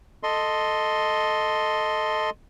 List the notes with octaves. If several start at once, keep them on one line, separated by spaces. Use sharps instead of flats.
A4 D#5 C6